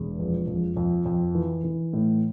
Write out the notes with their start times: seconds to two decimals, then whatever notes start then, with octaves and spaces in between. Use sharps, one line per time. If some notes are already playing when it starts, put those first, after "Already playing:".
Already playing: E1 E2
0.19 F2
0.47 F2
0.76 F2
1.05 F2
1.35 E3
1.64 E3
1.93 A2